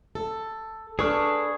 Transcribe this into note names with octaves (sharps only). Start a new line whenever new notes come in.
A4
D4 G#4 A4 B4 C#6 F6